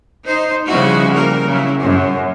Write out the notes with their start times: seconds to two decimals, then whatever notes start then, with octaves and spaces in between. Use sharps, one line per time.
0.24 D#4 C5
0.67 C#3 F3 G3 G#3 E4 F#4
1.14 G3 A#3 A#4
1.47 C#3 F#3 E4
1.80 F#2